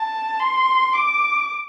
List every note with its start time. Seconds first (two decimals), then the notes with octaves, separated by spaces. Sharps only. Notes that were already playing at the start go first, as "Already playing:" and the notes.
Already playing: A5
0.40 C6
0.93 D6